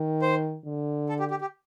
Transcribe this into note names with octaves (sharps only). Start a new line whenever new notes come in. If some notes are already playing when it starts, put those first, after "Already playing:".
Already playing: D#3
C5
D3
A4
G4
G4
G4